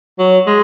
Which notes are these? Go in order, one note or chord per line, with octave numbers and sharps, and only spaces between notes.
F#3
G#3